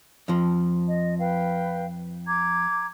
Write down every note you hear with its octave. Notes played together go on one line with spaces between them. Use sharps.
F2 F3
D#5
B4 F5 G5
A#5 D6 G#6